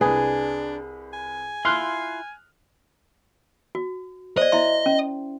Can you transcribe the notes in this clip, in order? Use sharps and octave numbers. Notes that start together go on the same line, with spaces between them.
C2 D4 G#4 B4
G#5
E4 F4 C6 F6 F#6
F#4
C5 D5 D#5
E4 E5 C6
C#4